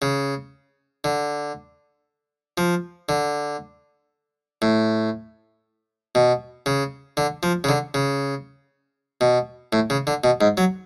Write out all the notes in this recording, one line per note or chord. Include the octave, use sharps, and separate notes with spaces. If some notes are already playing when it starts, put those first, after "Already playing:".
C#3
D3
F3
D3
A2
B2
C#3
D3
F3
C#3
D3
C#3
B2
A2
C#3
D3
B2
G#2
F#3